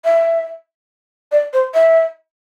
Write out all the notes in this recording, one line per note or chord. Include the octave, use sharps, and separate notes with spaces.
E5
D5
C5
E5